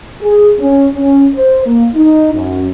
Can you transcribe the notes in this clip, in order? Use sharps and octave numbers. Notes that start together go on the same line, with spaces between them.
G#4
C#4
C#4
C5
A#3
D#4
F#2